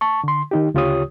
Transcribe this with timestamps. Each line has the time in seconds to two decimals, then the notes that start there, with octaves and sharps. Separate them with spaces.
0.01 A5 C#6
0.24 D3 C6
0.51 D#3 D#4 G4
0.74 D2 C#3 F4 G4 C#5 D#6